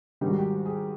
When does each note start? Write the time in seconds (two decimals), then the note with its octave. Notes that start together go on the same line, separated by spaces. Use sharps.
0.21 G#2 D#3 G3 G4
0.30 F#4
0.38 G4
0.66 G#4